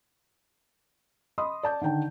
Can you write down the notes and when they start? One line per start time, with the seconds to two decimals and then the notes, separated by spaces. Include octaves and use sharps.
1.38 D#5 B5 C6 D#6
1.63 D5 A5 G6
1.81 D3 D#3 G5 A5